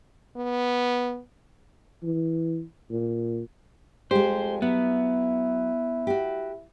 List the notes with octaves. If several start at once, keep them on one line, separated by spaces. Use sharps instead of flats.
B3
E3
A#2
F2 G#3 G4 C5
F#3 B3 E4
F#4 G4